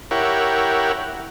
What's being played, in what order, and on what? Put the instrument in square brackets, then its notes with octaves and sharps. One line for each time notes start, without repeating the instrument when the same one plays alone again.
[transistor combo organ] E4 G4 A#4 C#5 F#5